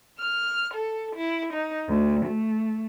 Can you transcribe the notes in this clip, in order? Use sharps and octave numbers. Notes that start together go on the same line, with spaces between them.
F6
A4
E4
D#4
D2
A3